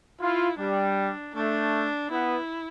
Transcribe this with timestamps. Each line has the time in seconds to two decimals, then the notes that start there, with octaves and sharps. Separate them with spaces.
0.21 E4 F4
0.59 G3 D4
1.35 A3 D4
2.11 B3 E4